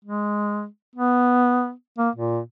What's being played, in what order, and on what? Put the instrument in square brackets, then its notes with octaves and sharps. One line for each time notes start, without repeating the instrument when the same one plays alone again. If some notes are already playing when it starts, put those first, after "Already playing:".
[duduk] G#3
B3
A#3
A#2